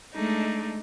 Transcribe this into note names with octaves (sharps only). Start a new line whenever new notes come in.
G#3 A3 D4 D#4